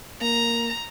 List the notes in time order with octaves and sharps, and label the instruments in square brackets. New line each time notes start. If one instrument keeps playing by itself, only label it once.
[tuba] A#3 [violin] A#5